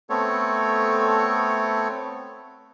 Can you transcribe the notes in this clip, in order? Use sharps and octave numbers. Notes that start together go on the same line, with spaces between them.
A3 B3 C4 A4 C#5